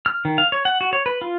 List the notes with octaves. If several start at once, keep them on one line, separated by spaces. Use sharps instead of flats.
F6
D#3
F5
C#5
F#5
F#4
C#5
B4
F4